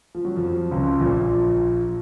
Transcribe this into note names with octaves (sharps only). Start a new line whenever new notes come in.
F3
F#3
F2 F3
C#2 C#3
A#1 A#2